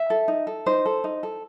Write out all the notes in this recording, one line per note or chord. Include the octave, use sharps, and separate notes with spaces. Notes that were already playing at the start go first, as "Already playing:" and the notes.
Already playing: E5
A4
D#4
A4
D#4 C5
A4
D#4
A4